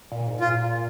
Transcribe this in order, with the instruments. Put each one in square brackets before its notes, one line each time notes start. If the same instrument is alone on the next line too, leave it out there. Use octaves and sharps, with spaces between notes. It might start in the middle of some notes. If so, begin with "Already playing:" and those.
[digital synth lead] A#2
G#2
[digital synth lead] A#2 [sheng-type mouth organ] F4